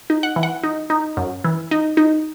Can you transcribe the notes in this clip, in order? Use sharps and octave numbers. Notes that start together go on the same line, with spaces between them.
D#4
F#5
E3
F#5
D#4
D#4
F#2
E3
D#4
D#4